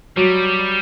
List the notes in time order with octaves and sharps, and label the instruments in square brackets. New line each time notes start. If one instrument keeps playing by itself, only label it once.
[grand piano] F#3 [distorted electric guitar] G3